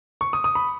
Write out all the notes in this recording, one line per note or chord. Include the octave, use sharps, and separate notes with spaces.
C#6
D#6
D#6
B5